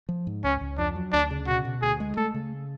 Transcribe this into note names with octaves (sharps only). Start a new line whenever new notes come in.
F3
G#2
C#2 C#4
C#2
F2 D4
F#3
D2 D4
C#3
B2 F#4
B2
D2 G#4
G#3
A3 A4
C#3